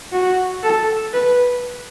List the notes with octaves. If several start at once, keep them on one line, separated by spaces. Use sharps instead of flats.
F#4
A4
B4